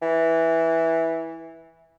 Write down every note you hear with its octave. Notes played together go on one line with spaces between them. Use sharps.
E3